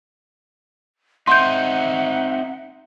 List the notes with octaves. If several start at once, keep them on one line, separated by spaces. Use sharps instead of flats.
C4 D#4 E5 F#5 C6 G6